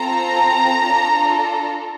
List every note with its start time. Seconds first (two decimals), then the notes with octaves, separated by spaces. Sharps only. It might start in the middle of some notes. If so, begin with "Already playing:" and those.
Already playing: C4 F4 A4 A#5
0.85 D4 F4 A4